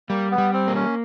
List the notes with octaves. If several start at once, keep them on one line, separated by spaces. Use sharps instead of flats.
G3 A#3
B3
G3
C4
A#3
C#4